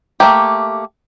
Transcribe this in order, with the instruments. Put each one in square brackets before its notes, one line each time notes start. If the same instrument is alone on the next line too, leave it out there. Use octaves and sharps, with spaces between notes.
[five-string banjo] A3 A#3 G4